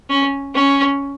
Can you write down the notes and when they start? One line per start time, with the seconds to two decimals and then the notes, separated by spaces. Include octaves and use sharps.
0.09 C#4
0.54 C#4